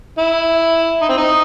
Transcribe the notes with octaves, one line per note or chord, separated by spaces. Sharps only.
E4
D#4
C4
D#4